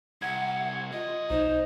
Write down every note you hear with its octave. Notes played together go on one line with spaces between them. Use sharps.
C2 F#5 G#6
F#2 F4 D#5
B1 D#4 C5